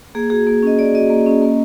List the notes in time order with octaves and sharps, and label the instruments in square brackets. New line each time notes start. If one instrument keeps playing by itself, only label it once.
[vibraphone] A#3 G#4
F#4 G#4
A#3
C#4 D#5
A#3 D5
F#4 D#5
A#3
C#4
A#3